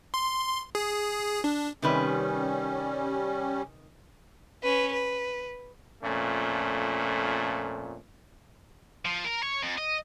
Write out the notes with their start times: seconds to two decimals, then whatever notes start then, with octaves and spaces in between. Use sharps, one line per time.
0.14 C6
0.75 G#4
1.44 D4
1.82 C3 D#3 G3 C#4 B4
4.63 C#4 B4
4.93 B4
6.03 F2 A#2 A3 C#4
9.05 F3
9.25 A#4
9.43 C#5
9.63 F2
9.78 D#5